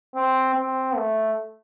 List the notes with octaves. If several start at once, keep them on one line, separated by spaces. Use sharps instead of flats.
C4
C4
A3